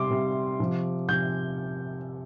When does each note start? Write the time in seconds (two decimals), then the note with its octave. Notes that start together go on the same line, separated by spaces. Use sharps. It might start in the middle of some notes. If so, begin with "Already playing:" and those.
Already playing: C3 G3 C6 D6
0.10 C3 G3
0.60 C3 F3
1.09 C3 F3 G6